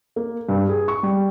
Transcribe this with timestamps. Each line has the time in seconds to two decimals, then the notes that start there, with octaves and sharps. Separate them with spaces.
0.16 A#3
0.49 G2
0.69 G#4
0.88 C#6
1.03 G3